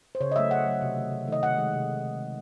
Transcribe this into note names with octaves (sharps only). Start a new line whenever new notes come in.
C5
C#3 C#5
D#5
F#3 A3 E5
C#3 F#5
F#3 A3
C3
D#3 A3
C3
D#3 A3 D#5
C3 F#5
D#3 G#3
C3